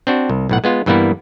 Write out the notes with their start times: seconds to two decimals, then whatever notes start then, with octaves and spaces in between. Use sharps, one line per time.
0.07 C4 D4 F#4
0.29 C2
0.49 B1 A2 F#5
0.64 G#3 B3 F4
0.86 G2 E3 G3 A#3 B3 E4